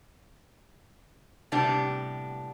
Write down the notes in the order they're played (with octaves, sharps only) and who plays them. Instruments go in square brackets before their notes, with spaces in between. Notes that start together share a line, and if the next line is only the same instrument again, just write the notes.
[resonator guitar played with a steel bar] A2 C3 G3 B3 D4 G4